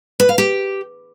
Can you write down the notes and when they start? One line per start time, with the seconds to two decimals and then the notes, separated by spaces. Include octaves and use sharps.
0.20 B4
0.29 F5
0.38 G4